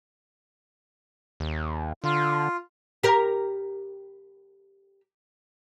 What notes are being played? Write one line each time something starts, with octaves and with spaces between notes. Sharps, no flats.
D#2
D3 F4
G4 A#4